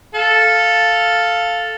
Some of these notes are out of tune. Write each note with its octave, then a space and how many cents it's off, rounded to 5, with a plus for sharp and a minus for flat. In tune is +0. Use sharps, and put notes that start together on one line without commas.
A4 +0 F5 +0